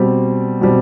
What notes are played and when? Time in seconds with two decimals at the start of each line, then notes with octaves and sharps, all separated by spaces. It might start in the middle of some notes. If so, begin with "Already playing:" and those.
Already playing: B2 G3 C4
0.61 B2 G3 C4